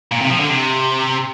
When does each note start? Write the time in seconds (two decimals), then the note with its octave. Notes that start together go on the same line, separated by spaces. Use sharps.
0.12 A#2
0.21 C3
0.30 F3
0.40 D3
0.49 C3